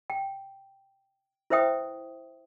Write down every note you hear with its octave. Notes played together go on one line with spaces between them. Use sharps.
G5
E4 B4 C5 E5 G5 D#6